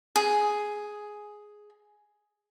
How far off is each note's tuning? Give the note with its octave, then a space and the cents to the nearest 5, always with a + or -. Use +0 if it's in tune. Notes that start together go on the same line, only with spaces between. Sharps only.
G#4 +5